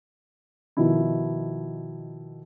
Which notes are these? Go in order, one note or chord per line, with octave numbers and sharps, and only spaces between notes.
B2 D#3 F3 E4